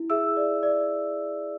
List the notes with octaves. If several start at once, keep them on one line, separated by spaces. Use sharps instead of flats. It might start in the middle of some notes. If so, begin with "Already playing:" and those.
Already playing: E4
G#4 E5 E6
D5
D5